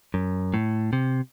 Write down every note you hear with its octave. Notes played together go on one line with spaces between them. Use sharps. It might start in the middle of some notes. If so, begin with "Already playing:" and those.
F#2
A2
C3